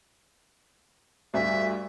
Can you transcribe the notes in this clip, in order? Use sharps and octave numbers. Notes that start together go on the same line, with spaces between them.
D2 G2 E5